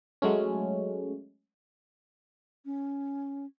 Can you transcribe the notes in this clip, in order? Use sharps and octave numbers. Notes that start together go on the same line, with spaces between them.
F#3 G#3 A3 C#4
C#4